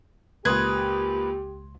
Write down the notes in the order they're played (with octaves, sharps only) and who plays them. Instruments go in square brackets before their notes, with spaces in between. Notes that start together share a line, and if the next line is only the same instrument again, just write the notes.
[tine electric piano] C#2 C6 [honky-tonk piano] A#2 D#6 G#6 [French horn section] G4 [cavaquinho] B4